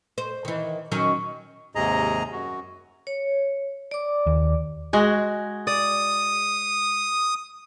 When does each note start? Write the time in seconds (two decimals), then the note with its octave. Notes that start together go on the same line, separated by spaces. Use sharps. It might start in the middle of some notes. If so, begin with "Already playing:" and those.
0.18 C5
0.45 D#3 E3
0.92 D#3 F#3 C#4
1.75 D#2 G#2 C3 G#4 D#5 A#5
2.32 F#2 F#4
3.07 C#5
3.91 D5 D6
4.26 D#2
4.93 G#3 F#4 G#4
5.67 D5 D#6